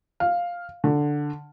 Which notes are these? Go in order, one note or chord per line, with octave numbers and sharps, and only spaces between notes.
F5
D3